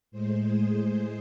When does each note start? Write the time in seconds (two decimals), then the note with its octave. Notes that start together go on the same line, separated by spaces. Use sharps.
0.11 A2 G#3 C5
0.43 G#4